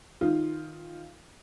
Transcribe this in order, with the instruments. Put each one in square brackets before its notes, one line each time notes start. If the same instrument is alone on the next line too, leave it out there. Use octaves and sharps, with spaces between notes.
[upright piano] D#3 F4